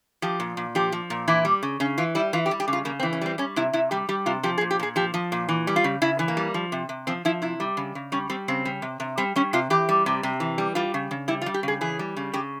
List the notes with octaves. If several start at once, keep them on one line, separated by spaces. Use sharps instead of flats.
F3 G4
A#2
A#2
F3 G4
F3
A#2
E3 E4
G3
C#3
C#3 C#4
E3 F4
G3 E4
E3 F4
G4
G3
G4
C#3
F4
C#3 A#3
C4
E3
C#4
G3 C4
G3 C#4
C3 E4
C3 E4
G3 G4
G3 G4
C3 F4
F3 G4
G#4
A#2
G4
A#2 G#4
F3 G4
F3
A#2
E3
G3
F4
C#3
C#3 E4
E3
A#3
G3
F3
C3
C3
F3 C4
F3 E4
C3 E4
G3
C#3
C#3
G3 C#4
G3 C4
C#3 C4
G3
C3
C3
G3 C4
G3 C#4
C3 F4
E3 G4
G3
C3
C3
E3
G3
G3 F4
C#3
C#3
G3 E4
F4
G3
G4
C#3 G#4
E3 G#4
G3
C#3
C#3 G4